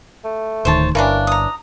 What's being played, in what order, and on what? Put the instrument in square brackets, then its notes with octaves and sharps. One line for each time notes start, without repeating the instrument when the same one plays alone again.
[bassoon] A3
[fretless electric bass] D1 D2 D#3 [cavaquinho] C5 C#5 A5
[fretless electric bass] G1 [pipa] E3 C#4 D4 [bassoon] A#3 [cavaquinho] A#4
[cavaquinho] A#5 D#6